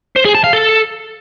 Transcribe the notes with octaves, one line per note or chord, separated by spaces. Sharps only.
C5
G#4
A5
F5
A4